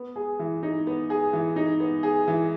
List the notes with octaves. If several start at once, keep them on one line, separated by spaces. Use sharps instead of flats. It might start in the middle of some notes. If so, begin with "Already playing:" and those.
Already playing: B3
G#4
E3
D#4
B3
G#4
E3
D#4
B3
G#4
E3